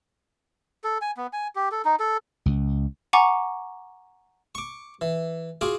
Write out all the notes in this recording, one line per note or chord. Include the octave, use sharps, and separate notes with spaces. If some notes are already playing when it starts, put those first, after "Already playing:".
A4
G#5
B3
G#5
G4
A4
D#4
A4
C#2
F#5 G#5 A#5 C#6 D6
C#6 D6
E3
F4 F#4 G#4 D6